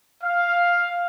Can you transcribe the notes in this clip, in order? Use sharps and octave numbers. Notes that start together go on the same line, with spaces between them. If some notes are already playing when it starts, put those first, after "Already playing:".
F5